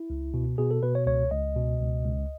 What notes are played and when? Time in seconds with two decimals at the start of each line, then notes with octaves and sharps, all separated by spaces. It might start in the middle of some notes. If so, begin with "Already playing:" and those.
Already playing: E4
0.10 C#2
0.34 B2
0.58 B2 G#4
0.71 A4
0.83 B2 B4
0.95 C#5
1.07 C#2 C#5
1.31 C#2 D#5
1.56 B2
1.80 C#2
2.05 C#2